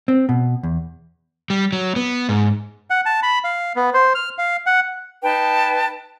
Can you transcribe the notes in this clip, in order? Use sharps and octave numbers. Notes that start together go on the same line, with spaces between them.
C4
B2
E2
G3
F#3
B3
G#2
F#5
A5
B5
F5
B3
C5
F6
F5
F#5
D#4 B4 G5 A5